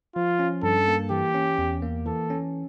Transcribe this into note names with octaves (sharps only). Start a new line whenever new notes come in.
F3 F4
C#4
G2 A4
A#3
E3 G4
C#4
E2
A#3
E3 A4
C#4